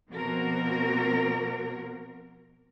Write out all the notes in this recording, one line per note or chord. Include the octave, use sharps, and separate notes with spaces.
B2 F3 A#3 C4 F#4 A#4